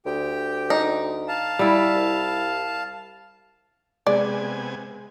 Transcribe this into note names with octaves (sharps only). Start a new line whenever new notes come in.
D2 G4 G5
D#4
F5 A5
G3 E4
C2
C3 G#3 B3 D5 G#5